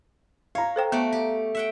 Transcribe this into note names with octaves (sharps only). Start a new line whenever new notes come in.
C#5 F5 A#5
A4 C5 G5
A3 B3 F#4 D5
G4
E5 F#5 G5